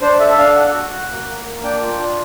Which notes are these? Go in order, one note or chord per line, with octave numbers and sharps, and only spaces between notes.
D4 C5
A4 E5
D4 F5
A4 F#5
F#4
F#4
A#3
A#3
A#3
D4 G5
F4
D4